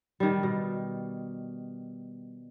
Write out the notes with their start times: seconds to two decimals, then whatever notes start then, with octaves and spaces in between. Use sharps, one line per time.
0.20 D#3 G3
0.43 B2